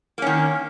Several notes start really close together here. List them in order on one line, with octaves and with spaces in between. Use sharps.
A#3 C#4 D#3